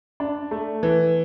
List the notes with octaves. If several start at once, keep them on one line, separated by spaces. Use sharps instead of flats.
D4
A3
E3